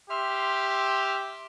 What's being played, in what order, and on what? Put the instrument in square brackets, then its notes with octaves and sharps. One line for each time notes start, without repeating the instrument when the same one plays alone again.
[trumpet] G4 [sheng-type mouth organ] E5 F6 [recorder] C6